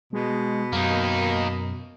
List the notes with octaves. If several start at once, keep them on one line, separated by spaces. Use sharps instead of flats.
B2 G#3
F#2 A#3 D#4